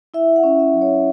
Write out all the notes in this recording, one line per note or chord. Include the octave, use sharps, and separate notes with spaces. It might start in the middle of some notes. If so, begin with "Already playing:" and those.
E4 E5
F#5
C#4
E5
F#3
C#5